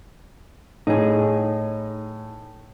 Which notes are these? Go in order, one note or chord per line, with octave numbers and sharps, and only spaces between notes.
A2 D#4 G#4